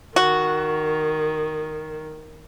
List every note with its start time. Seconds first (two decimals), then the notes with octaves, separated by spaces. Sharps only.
0.16 D#3 F#4